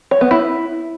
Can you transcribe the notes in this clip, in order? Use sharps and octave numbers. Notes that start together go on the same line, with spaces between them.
C#5
B3
E4